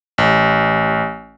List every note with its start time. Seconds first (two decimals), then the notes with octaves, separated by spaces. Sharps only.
0.18 A1